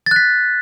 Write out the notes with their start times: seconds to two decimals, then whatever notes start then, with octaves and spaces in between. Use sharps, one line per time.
0.06 A6
0.11 F#6
0.16 B6